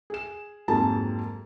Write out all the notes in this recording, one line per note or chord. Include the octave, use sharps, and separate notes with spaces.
G#4 E7
F2 G#2 F#3 A#3 G#4 A5